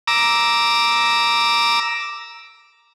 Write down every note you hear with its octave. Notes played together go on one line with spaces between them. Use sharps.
A#5 D6 E6